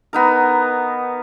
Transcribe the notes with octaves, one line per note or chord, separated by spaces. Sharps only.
B3 D#4 A#4